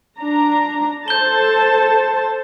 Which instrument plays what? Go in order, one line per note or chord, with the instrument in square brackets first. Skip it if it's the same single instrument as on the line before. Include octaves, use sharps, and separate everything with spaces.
[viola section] D4 A#5
[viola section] A4 C5 A5 [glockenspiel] G6 G7